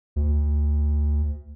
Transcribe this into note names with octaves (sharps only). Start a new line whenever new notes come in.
D2